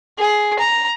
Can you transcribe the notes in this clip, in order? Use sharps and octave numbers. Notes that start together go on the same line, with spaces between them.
G#4
A#5